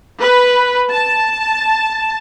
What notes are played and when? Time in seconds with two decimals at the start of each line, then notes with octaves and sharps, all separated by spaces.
0.20 B4
0.91 A5